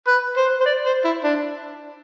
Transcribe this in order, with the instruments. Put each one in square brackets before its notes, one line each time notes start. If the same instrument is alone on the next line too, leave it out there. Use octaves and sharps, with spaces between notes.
[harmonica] B4
C5
C5
D5
C5
E4
D4